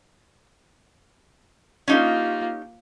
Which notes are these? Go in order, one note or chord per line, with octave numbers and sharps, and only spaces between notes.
A#3 C#4 D#4 F4 G4